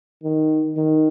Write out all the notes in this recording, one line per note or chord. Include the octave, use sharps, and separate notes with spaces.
D#3
D#3